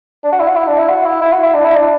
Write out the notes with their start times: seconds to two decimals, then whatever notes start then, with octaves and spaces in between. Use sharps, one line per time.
0.24 D4
0.32 F#4
0.40 E4
0.48 F#4
0.56 E4
0.67 D4
0.78 E4
0.89 F#4
1.05 E4
1.21 E4
1.32 F#4
1.43 E4
1.54 D4
1.65 E4
1.76 D4